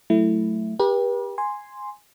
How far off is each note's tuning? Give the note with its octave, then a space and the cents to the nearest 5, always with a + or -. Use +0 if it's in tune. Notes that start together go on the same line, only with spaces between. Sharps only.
F#3 +0 A3 +0 E4 +0
G4 +20 B4 -40
G#5 -5 C6 +0